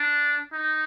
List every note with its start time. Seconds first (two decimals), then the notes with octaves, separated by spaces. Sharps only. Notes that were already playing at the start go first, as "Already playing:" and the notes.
Already playing: D4
0.53 D#4